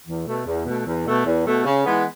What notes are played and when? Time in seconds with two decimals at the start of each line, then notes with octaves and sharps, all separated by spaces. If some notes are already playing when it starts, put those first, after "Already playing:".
0.06 E2
0.26 B2 A3
0.46 E2
0.65 B2 A3
0.86 E2
1.05 B2 A3
1.25 E2
1.45 B2 A3
1.65 C#3
1.85 E3 G#3 B3